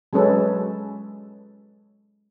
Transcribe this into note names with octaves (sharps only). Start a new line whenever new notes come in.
F#3 G#3 C#4 A4 B4